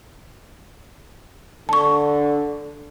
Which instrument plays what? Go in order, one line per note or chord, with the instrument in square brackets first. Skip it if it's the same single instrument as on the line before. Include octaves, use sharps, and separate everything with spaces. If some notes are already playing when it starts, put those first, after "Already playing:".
[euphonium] D3 [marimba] A5 C#6